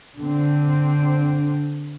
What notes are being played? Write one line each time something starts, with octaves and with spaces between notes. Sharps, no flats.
D3 C4